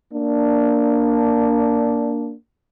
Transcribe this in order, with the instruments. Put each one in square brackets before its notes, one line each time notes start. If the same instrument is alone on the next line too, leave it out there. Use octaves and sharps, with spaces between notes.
[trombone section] A#3 D4